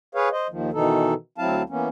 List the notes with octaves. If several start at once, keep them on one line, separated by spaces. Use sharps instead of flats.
G#4 B4 C#5 F5
C5 D#5
D#2 D#3 F3
B2 D#3 E3 D#4 A4
D2 F#3 C4 E4 F5 A5
E3 A#3 B3 C#4